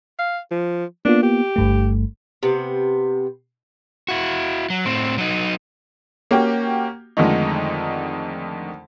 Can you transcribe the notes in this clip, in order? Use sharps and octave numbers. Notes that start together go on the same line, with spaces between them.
F5
F3
A#3 B3 D4 F4
G4
G1 G2 A3
C3 B3
E4 F#4
F#3
A2 C4
F#3 D#4
A#3 C#4 F#4 G4 G5
F2 D3 D#3 G#3 A3 D#4